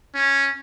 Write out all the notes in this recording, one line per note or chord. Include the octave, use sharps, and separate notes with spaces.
C#4